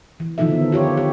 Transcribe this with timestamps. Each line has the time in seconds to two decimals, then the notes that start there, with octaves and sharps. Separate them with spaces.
0.20 E3
0.38 D3 D#3 F3 D#4 A4 E5
0.52 B3
0.72 F4 G4 C#5
0.97 G4